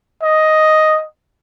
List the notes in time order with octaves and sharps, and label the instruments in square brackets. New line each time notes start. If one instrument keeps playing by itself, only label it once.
[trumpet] D#5